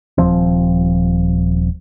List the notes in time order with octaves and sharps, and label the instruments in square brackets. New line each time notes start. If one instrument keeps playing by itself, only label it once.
[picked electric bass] D#1 F3 C4